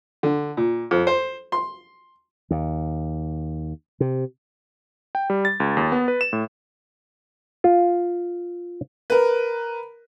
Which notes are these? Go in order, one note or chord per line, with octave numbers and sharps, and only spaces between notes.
D3
A#2
F2
C5
C6
D#2
C3
G5
G3
A6
C#2
D#2
B3
B4
E7
A2
F4
A#4 B4